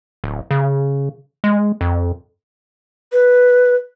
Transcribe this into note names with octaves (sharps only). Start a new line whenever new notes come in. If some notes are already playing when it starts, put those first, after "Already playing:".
D1
C#3
G#3
F2
B4